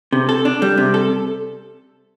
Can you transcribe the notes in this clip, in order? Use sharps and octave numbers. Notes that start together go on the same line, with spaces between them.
C3
A4
D4
G3
C3
A4